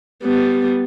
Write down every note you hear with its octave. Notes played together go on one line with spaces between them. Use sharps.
G3 B3